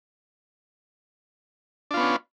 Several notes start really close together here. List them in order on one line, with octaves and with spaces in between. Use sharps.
D4 F4 B3 C#4